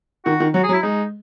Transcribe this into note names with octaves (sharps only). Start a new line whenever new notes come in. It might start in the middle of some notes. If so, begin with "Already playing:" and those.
D#3 F#4
D#3
F#3 F#4
G#4
F#3
E4
G#3 D#4